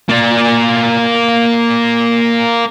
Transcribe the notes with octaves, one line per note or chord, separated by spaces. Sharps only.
A#3 D5